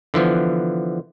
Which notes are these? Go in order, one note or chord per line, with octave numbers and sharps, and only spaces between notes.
D3 E3 F3 B3